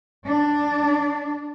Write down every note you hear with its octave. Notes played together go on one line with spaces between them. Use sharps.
D4